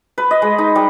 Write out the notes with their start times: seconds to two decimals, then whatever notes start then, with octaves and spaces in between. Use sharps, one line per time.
0.18 B4
0.31 D#5
0.42 G#3
0.58 D#4
0.76 G3